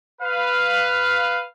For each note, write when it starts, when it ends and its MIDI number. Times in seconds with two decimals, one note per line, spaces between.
0.20 1.43 71
0.20 1.43 77